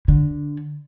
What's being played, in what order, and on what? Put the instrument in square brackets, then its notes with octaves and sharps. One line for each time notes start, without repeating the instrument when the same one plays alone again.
[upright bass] D3